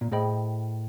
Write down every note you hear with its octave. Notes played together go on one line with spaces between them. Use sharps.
A#2
A2 G#4 C5 D#5 G5 B5